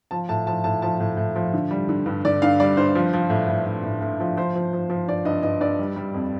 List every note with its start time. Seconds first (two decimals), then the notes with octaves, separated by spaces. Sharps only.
0.11 F3 A5
0.29 A2 A5
0.47 F3 A5
0.64 A2 A5
0.82 F3 A5
1.00 A2
1.17 A2
1.36 F3
1.54 D3
1.71 G3
1.89 D3
2.06 G2
2.25 D3 D5
2.42 G2 F5
2.60 G3 D5
2.77 G2 C5
2.95 F3
3.13 F3
3.30 A2
3.48 A2
3.66 A2
3.84 A2
4.01 A2
4.20 F3
4.37 F3 C5
4.55 F3
4.73 F3
4.90 F3
5.07 G2 D5
5.25 G2 D#5
5.43 G2 D#5
5.61 G2 D5
5.79 G3
5.96 G3
6.14 F2